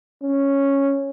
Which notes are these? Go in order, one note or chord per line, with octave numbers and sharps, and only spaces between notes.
C#4